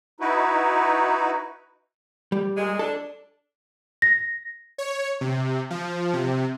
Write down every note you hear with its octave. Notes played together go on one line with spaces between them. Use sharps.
D#4 E4 F#4 B4
G3
A#2 G#3
D4 A4
A#6
C#5
C3
F3
C3